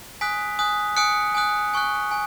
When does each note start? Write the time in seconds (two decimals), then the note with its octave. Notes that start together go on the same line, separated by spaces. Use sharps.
0.21 G#5 D#6 F#6 B6
0.59 G#5 D#6 F#6
0.97 G#5 D#6 F#6 C#7
1.35 G#5 D#6 F#6
1.74 G#5 C#6 F#6
2.11 G#5